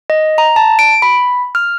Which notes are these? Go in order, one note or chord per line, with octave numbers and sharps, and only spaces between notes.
D#5
A#5
A5
D7
B5
F6